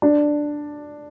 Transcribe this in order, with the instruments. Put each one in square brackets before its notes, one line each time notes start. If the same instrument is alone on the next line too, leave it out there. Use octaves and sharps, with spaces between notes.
[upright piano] D4